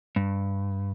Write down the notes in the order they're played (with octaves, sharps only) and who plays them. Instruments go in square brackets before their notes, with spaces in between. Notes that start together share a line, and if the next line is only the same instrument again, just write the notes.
[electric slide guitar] G2